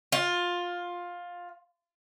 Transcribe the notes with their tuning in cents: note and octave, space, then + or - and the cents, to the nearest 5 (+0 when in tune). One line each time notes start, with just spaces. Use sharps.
F4 +15